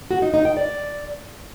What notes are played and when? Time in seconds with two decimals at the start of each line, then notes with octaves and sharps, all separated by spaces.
0.11 F#4
0.22 D#4
0.34 D#4
0.45 G5
0.57 D5